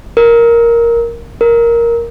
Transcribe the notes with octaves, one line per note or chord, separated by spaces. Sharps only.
A#4
A#4